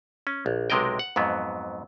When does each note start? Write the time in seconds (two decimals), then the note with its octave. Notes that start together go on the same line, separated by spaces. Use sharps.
0.27 C#4
0.46 A#1
0.70 B1 C3 G#3 A#4 D#5 G5
0.99 F#5
1.16 F2 G#2 F#3 B3